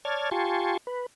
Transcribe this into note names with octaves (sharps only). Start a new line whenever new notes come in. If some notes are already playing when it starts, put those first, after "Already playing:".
C#5 D5 A5 F6 G#6
F4 G4 G#5 A5 C6 C#6
B4